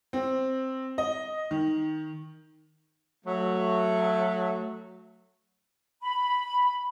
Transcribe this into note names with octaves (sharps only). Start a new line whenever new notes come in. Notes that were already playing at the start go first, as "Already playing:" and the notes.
C4
D#5
D#3
F#3 A3
B5